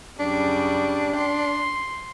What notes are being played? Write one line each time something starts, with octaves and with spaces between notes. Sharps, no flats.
F#2 C#3 G3 D4
C6